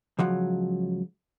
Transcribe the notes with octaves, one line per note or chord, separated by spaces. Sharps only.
C#2 F3 F#3